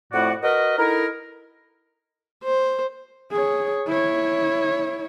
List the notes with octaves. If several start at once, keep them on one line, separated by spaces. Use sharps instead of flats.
F2 A2 A3 F#4 D5 F#5
F#4 A#4 B4 D#5
D#4 E4 A4 A#4
C5
G#4 C#5
E4 C#5